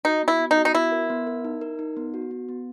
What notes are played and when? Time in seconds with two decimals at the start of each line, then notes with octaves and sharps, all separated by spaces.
0.05 D#4 F#4
0.23 B3 E4
0.40 B3
0.51 D#4
0.57 F#4
0.65 D#4
0.74 B3 E4
0.92 A#4
1.10 B3
1.27 A#4
1.45 D#4
1.61 A#4
1.79 D#4
1.97 B3
2.14 F#4
2.31 B3
2.49 B3